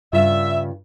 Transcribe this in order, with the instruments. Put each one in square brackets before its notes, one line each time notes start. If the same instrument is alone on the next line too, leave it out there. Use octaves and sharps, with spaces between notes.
[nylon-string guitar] G2 C#3 F4 [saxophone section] E5